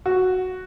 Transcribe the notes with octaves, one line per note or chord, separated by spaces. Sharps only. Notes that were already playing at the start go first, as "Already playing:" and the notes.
F#4